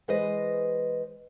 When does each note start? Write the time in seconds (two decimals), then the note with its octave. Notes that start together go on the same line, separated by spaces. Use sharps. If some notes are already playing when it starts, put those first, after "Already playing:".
0.08 E3 G#3 B4 C5 D#5